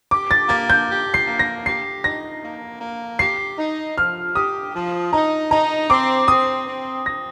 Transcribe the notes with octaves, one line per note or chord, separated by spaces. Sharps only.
G4 D6
A6
A#3 A6
G6
G4
C7
A#3
A#6
G4 C7
D#4 A#6
A#3
A#3
G4 C7
D#4
F3 F6
G4 D#6
F3
D#4 A#5
D#4 A#5
C4 D6
C4 D#6
C4
C4 A#6